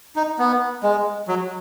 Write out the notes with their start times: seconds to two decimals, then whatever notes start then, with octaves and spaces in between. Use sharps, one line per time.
0.16 D#4
0.39 B3
0.83 G#3
1.28 F#3